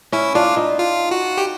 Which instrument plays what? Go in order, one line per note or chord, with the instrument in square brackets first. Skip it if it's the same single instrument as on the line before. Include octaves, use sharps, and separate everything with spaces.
[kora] C#4 [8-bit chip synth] E4
[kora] D4 [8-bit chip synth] F4
[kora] D#4
[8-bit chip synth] F4
F#4
G4